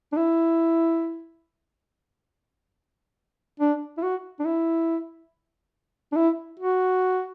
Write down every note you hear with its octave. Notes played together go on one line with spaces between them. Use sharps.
D4
E4
D4
E4
F#4
D4
E4
D4
E4
F#4